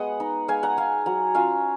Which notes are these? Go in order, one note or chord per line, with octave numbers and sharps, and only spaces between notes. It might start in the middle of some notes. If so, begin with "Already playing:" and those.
Already playing: G#3 B3 D#5 F#5
D#4
G#3 F5 G#5
F#5 A#5
D#4 F5 G#5
F#3 F#5 A#5
C#4 F4 F5 G#5